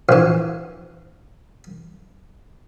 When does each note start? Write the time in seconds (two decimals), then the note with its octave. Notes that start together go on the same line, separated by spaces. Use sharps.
0.09 A#1 E3